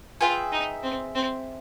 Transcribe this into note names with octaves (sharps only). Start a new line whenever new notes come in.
F4 G#4 B4 E5 G5
D#4
C4
C4